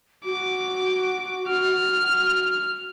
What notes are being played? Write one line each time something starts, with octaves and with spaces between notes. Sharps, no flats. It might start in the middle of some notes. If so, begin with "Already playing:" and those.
F#4 D6
F6